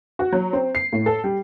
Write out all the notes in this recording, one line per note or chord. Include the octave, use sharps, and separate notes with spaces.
F#4
F#3
C4
C7
A2
A4
G3